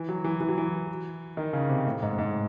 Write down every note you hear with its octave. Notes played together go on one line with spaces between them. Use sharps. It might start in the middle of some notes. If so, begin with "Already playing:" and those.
Already playing: E3
F#3
E3
E3
F#3
E3
D#3
C#3
C3
A2
G#2
G#2